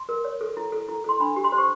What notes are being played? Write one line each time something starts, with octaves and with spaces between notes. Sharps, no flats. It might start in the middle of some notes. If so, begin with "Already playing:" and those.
Already playing: C6
A#4
C#5
A4
E4
A4
E4
A4 C6
D4 B5
G4
C6
C5
C#6